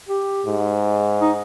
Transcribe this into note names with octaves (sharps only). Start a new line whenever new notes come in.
G4
G#2
D#4